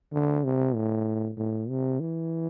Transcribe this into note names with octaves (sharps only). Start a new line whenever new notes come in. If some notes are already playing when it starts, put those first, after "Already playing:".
D3
C3
A2
A2
C3
E3